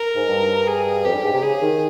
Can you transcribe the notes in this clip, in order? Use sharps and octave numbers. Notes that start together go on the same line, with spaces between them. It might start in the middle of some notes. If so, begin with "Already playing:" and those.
Already playing: A#4
G#2
G2
G#4
F2 G4
G2
G#2
C3
C#3 G#4
D#3